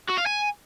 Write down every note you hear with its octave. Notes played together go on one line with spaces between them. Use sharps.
F#4
F5
G#5